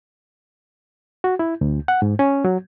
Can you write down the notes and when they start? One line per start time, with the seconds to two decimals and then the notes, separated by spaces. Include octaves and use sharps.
1.24 F#4
1.39 E4
1.61 D2
1.88 F#5
2.02 G#2
2.19 C#4
2.45 F#3